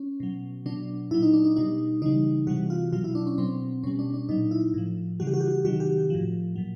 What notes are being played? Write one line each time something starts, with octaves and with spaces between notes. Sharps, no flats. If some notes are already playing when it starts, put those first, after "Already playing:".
Already playing: C#4
B2 F#3
B2 F#3 D4
A#2 F#3 E4
D#4
D4
D#4
B2 G3 D#4
C#3 E3 G3 D#4
C3 E3 G3 F#4
F4
B2 F#3 F4
E4
D4
C#4
B2 F#3 C4
B2 G3 C#4
D4
D4
A#2 F#3 D#4
E4
A2 F3
C#3 E3 G3 F#4
G4
F#4
G4
F#4
C3 D#3 F#3 F#4
G4
A2 F3
A#2 F#3